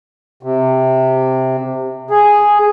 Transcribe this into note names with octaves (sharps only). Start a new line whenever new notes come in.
C3
G#4